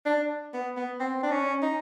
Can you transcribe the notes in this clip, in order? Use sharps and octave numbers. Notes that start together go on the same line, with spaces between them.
D4
B3
B3
C4
D4
C#4
D#4